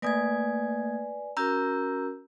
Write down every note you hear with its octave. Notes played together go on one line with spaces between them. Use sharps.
A3 A#3 B4 D5 G#5 G#6
C#4 F#4 A#4 A#5 E6 G6